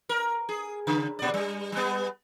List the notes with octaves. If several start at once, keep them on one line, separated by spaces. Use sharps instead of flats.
A#4
G#4
C#3
A#2 D5
G3
G3 B3